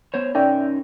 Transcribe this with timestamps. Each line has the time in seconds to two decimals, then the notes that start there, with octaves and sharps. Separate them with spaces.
0.14 B3 C5 C#5
0.35 C#4 D#4 A#4 D5 E5 G5